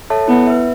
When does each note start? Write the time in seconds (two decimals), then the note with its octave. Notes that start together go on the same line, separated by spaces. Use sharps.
0.10 A4 C#5 E5 A5
0.28 B3 E4
0.47 B4 E5